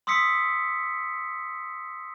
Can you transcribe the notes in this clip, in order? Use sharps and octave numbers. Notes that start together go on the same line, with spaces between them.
C6 D#6 E6 B6 C#7